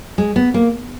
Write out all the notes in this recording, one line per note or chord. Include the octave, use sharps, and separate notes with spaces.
G#3
B3
A#3